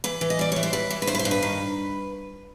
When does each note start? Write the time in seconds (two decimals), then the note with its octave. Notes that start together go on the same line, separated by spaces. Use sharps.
0.04 E3 B4
0.21 E3
0.30 D#5
0.39 G3 D5
0.52 E3 C#5
0.63 C5
0.73 E3 B4
0.90 E3
1.02 B4
1.07 G2 C5
1.15 B4
1.19 C5
1.25 G2
1.31 B4
1.43 D#3